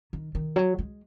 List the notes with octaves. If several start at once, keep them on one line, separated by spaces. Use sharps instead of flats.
D#3
D#3
F#3
G#3